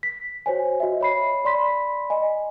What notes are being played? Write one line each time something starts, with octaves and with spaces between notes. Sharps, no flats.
B6
F#4 C5 C#5 G#5
F#4 D#5 E5
C#5 B5 C7
D5 B5 C6 B6
D#5 G#5